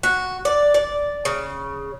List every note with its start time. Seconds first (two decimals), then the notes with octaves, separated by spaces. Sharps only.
0.03 F#4
0.45 D5
0.74 D5
1.25 C#3